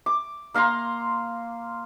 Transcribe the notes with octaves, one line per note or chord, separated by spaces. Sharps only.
D6
A#3 F5 A#5 C6